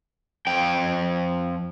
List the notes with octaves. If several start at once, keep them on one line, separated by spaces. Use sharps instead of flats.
F2 G5